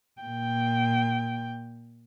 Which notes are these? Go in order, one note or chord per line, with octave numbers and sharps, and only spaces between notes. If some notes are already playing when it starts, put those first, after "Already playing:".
A#2 G5